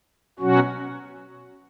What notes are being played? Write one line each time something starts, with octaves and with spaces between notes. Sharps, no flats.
B2 F#3 C#4 F#4